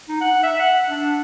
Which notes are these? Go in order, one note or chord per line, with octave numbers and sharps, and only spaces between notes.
D#4
F#5
E5
F#5
D4